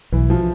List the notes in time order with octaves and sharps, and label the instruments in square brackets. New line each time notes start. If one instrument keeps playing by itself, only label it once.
[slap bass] B1 [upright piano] E3
[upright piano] F3